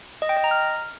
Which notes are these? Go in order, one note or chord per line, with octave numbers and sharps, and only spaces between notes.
D#5
G5
D#5
A#5
F6